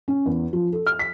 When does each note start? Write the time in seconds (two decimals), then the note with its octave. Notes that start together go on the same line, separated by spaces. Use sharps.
0.08 C#4
0.26 E2
0.53 F3
0.73 A4
0.86 F6
0.99 B6